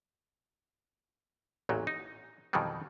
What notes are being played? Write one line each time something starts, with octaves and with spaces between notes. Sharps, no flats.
A1 E2 A#2 F#3
D#4
F2 B2 D#3 E3 F#3 G3